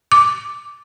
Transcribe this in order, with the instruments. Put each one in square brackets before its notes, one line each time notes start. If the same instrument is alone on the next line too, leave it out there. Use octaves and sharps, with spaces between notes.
[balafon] D6